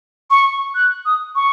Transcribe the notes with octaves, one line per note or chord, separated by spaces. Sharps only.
C#6
F#6
D#6
C#6